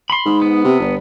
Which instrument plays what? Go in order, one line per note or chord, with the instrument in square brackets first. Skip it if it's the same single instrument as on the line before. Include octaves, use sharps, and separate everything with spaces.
[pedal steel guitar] B5 C6
[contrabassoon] G#2
[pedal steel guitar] B3
[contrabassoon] C3
G1